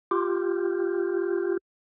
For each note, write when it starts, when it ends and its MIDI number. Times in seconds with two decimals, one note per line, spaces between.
0.11 1.57 65
0.11 1.57 67